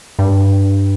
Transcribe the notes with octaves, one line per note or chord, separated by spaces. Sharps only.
G2